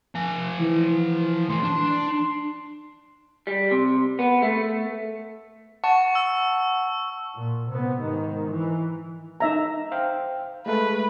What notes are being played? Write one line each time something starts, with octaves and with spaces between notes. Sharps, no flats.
F3 G#5
E3
A2 E3 C6
D4
G3
C3
B3
A3
F#5 A5 C#6
E6
A#2
C3 B3
G#2 D#3
E3
D#4 E5 A#5
C5 F5 G5
G#3 A3 B4